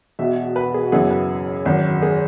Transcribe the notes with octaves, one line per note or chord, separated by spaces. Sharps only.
E1 E2 B2 E5
B4
G#4
F#4
F#1 F#2 E3 B3 E4 G#4
B4
G#1 F#2 E3
G#4